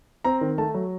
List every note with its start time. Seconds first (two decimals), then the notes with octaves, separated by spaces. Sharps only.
0.24 C4 A#5
0.41 D#3
0.58 A3 A5
0.74 F#3